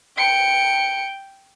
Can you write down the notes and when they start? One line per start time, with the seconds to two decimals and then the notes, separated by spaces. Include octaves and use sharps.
0.17 G5 C#7